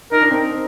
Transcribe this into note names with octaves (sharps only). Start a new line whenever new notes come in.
D#4 A#4
D4
C4 D#4